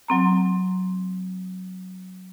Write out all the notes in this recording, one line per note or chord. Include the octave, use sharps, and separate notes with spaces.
F#3 C4 A#5